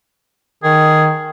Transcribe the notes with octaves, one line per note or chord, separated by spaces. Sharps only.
D#3 G#4